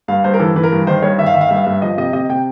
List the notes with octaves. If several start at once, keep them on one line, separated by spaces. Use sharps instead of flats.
G2 F5
G2 C5
A#4
E3 A4
E3 B4
A#4
G2
D#3 C5
G2 C#5
D#3 E5
F5
D#3 E5
F5
G2 E5
F5
G2 E5
F3 D#5
C3 D#5
C3 D#5
C3 G5